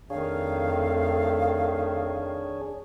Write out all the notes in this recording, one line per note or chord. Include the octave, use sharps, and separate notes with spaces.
F2 D#3 A3 D4 G#4 C#5 F5